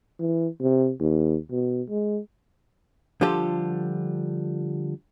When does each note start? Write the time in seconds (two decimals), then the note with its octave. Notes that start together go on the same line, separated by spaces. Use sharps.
0.20 E3
0.61 C3
1.00 D#2
1.51 B2
1.89 G#3
3.21 D3 F3 G3 F4 G4 A4